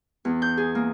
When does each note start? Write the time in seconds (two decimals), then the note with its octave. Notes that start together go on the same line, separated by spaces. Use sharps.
0.25 E2
0.42 G6
0.57 G#4
0.75 A#3